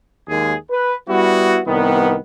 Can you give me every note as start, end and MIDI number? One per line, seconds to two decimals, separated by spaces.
0.28 0.54 39
0.28 0.54 56
0.28 0.54 68
0.70 0.95 71
1.08 1.59 55
1.08 1.59 59
1.08 1.59 64
1.08 1.59 66
1.65 2.15 36
1.65 2.15 51
1.65 2.15 55
1.65 2.15 59